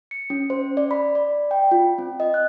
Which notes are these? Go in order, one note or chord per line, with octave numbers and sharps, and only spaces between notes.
C#7
C#4
C5
D5
B5
D5
G5
F4
C4
D#5
F#6